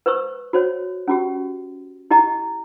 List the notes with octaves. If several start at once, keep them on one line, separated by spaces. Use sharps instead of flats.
B4 C5 C#6 E6
F#4 C5 C#5
C#4 F#4 G4
E4 G4 D#5 A#5